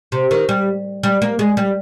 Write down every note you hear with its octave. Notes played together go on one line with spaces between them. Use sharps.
C3
D#3
G3
G3
A#3
G#3
G3